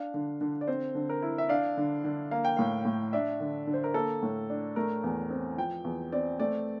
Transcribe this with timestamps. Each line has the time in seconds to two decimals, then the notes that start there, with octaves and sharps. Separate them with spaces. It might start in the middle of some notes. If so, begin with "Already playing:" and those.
Already playing: D4 F5
0.14 D3
0.41 D3
0.61 D5
0.67 C4 C5
0.95 D3
1.09 A#4
1.22 E4
1.38 E5
1.49 D4 F5
1.77 D3
2.04 D3
2.31 A#3 F5
2.45 G5
2.57 A2 F5
2.85 A2
3.13 D4 E5
3.40 D3
3.67 D3
3.73 C5
3.84 A#4
3.94 A#3 A4
4.22 A2
4.50 D4
4.76 A3 A#4
5.04 E2
5.30 C4
5.57 F3 G5
5.84 E2
6.12 C4 D5
6.40 A3 D5